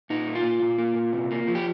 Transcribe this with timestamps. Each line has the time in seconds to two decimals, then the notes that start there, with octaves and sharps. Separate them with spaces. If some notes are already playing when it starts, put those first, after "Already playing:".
0.10 A#2 D#4
0.28 A#3
0.35 F4
0.44 A#2
0.62 A#2
0.78 A#3
0.95 A#2
1.13 C3
1.31 A#3
1.47 F3
1.55 G4